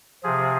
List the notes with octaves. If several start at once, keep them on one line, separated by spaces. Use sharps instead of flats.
C3 F3 G#4